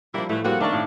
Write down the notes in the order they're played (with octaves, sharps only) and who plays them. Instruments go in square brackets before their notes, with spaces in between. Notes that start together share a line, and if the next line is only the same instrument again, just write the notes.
[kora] F3 G3 [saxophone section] A#3 D4 E4
[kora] A2 [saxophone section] E3 A3
[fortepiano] G3 [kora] A#3 C4 C#4 [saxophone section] F#4
[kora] D#3 A#3 [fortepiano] A3 A#4 C#6 [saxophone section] D4
[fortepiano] A2 F5